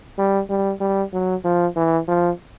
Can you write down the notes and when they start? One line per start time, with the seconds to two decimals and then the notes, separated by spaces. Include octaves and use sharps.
0.19 G3
0.50 G3
0.81 G3
1.13 F#3
1.45 F3
1.77 E3
2.08 F3